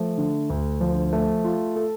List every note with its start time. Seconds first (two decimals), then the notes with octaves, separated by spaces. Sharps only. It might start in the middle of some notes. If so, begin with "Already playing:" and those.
Already playing: F3 A3
0.18 D3
0.50 D2
0.81 F3
1.13 A3
1.44 F4
1.76 A4